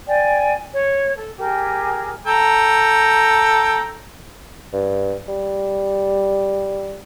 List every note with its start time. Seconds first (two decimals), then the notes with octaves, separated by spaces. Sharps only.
0.07 D5 G5 G#5
0.72 C#5
1.16 A4
1.37 G4 G#4 A#4
2.26 A4 G5 A#5
4.73 G2
5.28 G3